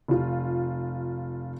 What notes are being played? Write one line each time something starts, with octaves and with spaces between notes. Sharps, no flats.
F1 F4